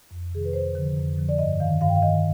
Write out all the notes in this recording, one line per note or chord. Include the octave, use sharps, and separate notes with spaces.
F2
C3 D#3 G#4
B4
F2 C5
D3 F3
F2
D3 F3
D5
G2 D#5
D#3 F5
G2 F5
G5
F5
D#3 D#5